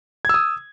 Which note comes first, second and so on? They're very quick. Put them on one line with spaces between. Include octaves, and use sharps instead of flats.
G#6 E6 D#6